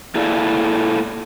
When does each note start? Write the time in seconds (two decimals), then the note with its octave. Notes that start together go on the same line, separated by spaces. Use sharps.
0.15 A#3 E4 G#4 A4 D5 F5